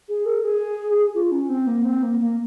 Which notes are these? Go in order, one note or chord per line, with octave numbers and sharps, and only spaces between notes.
G#4
A#4
G#4
F4
C#4
C4
A#3
C4
A#3
A#3